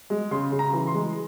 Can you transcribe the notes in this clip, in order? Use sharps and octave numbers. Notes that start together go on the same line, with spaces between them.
G#3
C#3 C6
C#3
A#5
E3
C6
G#3